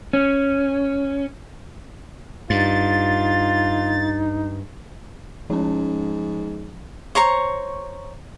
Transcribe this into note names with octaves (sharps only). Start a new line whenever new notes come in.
C#4
G2 D#4 F4 A6
G#2 F3 C#4
C5 C#5 A#5 C#6